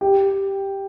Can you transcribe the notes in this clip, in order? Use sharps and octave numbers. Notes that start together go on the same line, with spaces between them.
G4